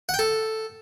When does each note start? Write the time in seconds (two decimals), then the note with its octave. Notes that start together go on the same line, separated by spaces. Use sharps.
0.09 F#5
0.14 G5
0.19 A4